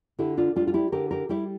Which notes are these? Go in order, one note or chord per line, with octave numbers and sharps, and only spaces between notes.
D3 E4 G4
D4 F4
G3 D4 F4
F4
E4 G4
D3 G4 A#4
G4 A#4
G3 E4 G4